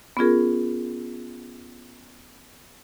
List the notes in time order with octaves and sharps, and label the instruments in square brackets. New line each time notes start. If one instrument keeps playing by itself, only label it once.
[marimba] B3 C#4 F4 G#4 A#4